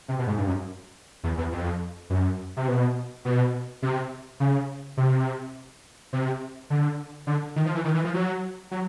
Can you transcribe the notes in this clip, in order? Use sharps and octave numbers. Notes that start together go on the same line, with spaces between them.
C3
B2
G#2
G2
F#2
E2
E2
F2
F#2
C3
B2
B2
C3
C#3
C3
C3
D3
D3
D#3
F3
E3
D#3
E3
F3
F#3
F#3